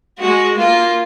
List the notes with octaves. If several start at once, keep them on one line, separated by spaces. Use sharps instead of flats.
G#3 F#4
A#3 F4